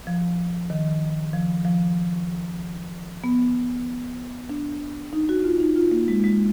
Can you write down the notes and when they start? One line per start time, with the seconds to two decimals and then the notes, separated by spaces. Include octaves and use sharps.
0.07 F3
0.70 D#3
1.33 F3
1.65 F3
3.24 B3
4.50 D4
5.13 D#4
5.29 F#4
5.44 F4
5.60 D#4
5.76 F4
5.92 A#3
6.08 G#3
6.24 G#3